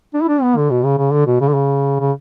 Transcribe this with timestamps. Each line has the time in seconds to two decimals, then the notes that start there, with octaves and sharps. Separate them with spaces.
0.14 D4
0.22 E4
0.29 D4
0.43 B3
0.57 D3
0.71 B2
0.85 C#3
0.98 C#3
1.13 D3
1.27 B2
1.41 C#3
1.49 D3
1.54 C#3
2.00 C#3